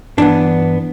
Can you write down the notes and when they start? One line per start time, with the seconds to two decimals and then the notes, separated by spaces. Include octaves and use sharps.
0.18 G2 E3 B3 D4